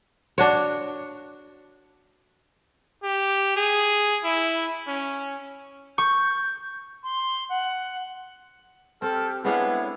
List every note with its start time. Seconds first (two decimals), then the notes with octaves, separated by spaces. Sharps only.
0.38 D4 F#4 C#5
3.03 G4
3.57 G#4
4.24 E4
4.88 C#4
5.98 C#6 G6
7.03 C6
7.49 F#5
9.02 C4 G4 A4 F6
9.45 G#3 B3 D4 E4 C#5 F5